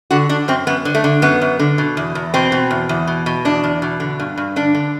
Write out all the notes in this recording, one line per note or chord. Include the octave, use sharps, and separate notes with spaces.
D3 F#4
D3 D4
F#2 C4
F#2 B3
D3
A3
D3
F#2 B3
F#2
D3
B2
E2
E2
B2 C4
B2
E2
E2
B2
B2
E2 D4
E2
B2
D3
G2
G2
D3 D4
D3